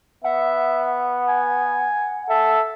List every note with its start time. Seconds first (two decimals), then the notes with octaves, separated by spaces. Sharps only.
0.24 B3 E5 F#5
1.28 G#5
2.30 A4 E5